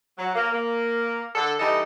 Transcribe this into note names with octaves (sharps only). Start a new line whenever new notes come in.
F#3
A#3
A#3
D3 A4
E3 G3 D#4 A4 D#5